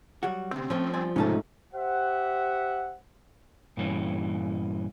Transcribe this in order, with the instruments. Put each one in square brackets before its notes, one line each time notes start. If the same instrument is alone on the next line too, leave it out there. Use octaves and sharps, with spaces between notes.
[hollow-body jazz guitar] F#3 G3 F#4
[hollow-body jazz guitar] D2 C3 [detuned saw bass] C4
[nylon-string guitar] F3 [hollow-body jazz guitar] A3 C#4
[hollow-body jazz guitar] G2 D5 G#5
[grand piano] G#2 A3 [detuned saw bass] C3 [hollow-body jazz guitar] C#4 D#4 A5
[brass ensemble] G4 C5 E5 F#5
[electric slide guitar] G2 A#2 E3 C#4